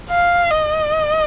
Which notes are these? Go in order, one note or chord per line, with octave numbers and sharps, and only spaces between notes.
F5
D#5